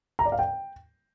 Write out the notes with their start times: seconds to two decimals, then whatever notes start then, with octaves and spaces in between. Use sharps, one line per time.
0.19 A#5
0.25 D5
0.32 F5
0.39 G5